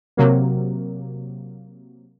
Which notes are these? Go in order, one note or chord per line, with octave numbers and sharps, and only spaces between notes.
C3 F#3 A#3